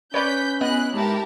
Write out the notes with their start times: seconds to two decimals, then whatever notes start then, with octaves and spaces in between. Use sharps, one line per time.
0.14 C#4 B4 C#5 D5 B5 G6 B6
0.61 B3 E4 G#4 D#5 F#6
0.93 G#2 E4 G4 A#4 A5